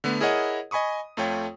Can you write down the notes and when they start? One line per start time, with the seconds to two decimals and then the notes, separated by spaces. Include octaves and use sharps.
0.04 D3 A3 B3
0.20 E4 G#4 A#4 C#5 D#5 F#5
0.71 D#5 G#5 B5 C#6 D#6
1.17 F2 A3 F4 C#5 G5